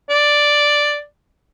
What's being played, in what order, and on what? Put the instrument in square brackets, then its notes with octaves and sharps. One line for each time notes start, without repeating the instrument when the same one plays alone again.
[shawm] D5